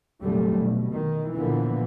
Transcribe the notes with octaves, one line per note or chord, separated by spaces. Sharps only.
F1 A#2 D3 F#3 G3 A3
B2
D#3
A#2 D3 E3 F3 A#3 B3